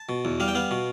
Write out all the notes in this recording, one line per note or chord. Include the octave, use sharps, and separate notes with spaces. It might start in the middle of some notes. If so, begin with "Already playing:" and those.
Already playing: A5
B2
E2
G3 F5
G5
B3 F5
B2